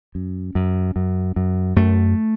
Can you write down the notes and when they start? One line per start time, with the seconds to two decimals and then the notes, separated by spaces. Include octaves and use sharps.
0.15 F#2
0.55 F#2
0.96 F#2
1.36 F#2
1.76 F#2 A3